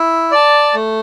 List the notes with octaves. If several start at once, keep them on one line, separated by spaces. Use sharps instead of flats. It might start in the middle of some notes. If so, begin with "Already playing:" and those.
Already playing: E4
D5 A5
A3